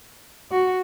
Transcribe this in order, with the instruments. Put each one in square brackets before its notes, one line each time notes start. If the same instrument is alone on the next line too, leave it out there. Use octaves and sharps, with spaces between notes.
[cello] F#4